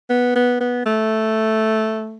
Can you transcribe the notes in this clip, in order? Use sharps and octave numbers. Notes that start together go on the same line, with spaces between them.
B3
B3
B3
A3